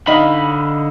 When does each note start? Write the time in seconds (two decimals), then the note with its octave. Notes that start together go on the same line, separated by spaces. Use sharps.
0.07 D3 D#4 D#5 F5 B5